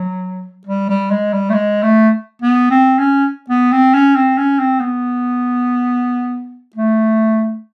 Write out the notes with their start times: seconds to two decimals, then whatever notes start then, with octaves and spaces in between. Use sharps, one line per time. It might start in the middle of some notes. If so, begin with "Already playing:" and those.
Already playing: F#3
0.67 G3
0.90 G3
1.11 G#3
1.33 G3
1.50 A3
1.54 G#3
1.83 A3
2.42 B3
2.71 C4
2.99 C#4
3.50 B3
3.72 C4
3.94 C#4
4.16 C4
4.38 C#4
4.59 C4
4.80 B3
6.76 A3